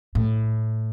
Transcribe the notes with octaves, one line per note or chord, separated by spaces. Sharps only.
A2